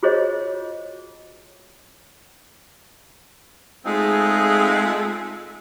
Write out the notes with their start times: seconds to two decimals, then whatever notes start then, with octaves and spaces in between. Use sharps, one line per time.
0.03 F4 F#4 G#4 C5 C#5 D#5
3.86 G#3 A3 C4 D#4 F4 G#4